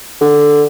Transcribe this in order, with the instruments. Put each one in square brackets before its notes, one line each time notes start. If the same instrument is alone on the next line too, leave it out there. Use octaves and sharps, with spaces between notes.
[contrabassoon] D3